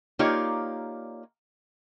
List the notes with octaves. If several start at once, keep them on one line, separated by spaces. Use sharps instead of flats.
A#3 D#4 F4 G4 C#5 D5